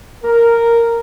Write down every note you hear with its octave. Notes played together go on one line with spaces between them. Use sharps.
A#4